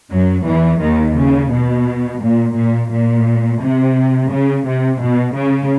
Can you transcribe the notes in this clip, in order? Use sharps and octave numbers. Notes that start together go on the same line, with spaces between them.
F#2 F#3
E2 E3
D#2 D#3
C#3
B2
A#2
A#2
A#2
C3
C#3
C3
B2
C#3